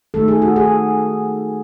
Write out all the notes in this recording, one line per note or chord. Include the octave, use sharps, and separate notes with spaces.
D#3 A3 A4
G#4
F#4
G#4